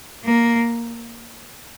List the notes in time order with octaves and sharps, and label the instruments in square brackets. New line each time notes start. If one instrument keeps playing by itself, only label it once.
[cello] A#3